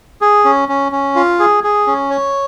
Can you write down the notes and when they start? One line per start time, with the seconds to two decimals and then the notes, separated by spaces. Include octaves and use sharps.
0.21 G#4
0.45 C#4
0.69 C#4
0.92 C#4
1.16 F4
1.39 G#4
1.64 G#4
1.87 C#4
2.10 C#5